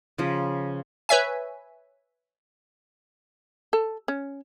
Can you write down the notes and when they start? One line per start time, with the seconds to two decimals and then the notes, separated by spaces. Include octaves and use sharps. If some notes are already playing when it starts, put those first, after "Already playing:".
0.18 C#3 F3
1.09 B4 C#5 E5 G#5
3.73 A4
4.08 C#4